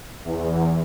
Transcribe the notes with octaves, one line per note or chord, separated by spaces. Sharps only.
E2